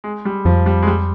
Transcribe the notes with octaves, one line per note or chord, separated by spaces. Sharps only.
G#3
G3
F2 F3
G3
G#3
G3